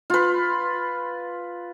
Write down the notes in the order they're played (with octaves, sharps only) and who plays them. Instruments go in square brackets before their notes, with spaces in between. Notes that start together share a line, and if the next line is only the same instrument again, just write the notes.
[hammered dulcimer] F4 B4